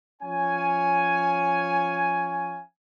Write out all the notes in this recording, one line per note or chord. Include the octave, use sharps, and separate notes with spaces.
F3 C#4 C#5 F5 G#5